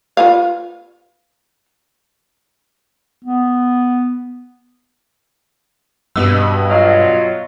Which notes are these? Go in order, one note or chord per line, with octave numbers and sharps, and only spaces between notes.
F4 B4 F5
B3
G2 B2 B3 E6
F#3 F4 C#5 D#5 F6